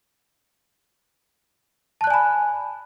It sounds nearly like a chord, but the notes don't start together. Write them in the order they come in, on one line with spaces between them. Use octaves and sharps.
A5 F#6 D5 G#5 B5